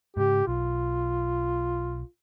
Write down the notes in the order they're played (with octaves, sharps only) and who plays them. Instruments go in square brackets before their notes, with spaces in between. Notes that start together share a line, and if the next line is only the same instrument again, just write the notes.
[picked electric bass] G#2 C#3 [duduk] G4
[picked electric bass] B1 [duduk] F4